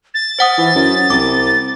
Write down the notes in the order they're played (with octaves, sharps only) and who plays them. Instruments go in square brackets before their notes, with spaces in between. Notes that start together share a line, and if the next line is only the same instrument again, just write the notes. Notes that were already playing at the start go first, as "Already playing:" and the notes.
[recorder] A6
[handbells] C5 F#5 D#6
[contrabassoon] E3
F#2
[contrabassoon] C2 [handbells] D6